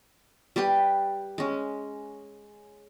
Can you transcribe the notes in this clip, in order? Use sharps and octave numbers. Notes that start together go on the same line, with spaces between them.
G3 G4 B4 G5
G#3 C#4